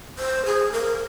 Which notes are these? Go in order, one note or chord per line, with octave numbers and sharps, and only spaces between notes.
C5
G#4
A#4